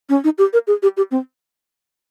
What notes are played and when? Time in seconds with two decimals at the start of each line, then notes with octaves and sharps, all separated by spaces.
0.09 C#4
0.24 D#4
0.38 G4
0.53 A#4
0.67 G#4
0.83 G4
0.97 G4
1.11 C4